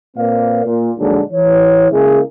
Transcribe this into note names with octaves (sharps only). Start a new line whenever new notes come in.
A#2 C4 A#4 B4 D5 F5
A#2
A#1 D#2 D3 F#3 G#3 D4
E3 C#5
C#3 G#3 A#3 E4 G#4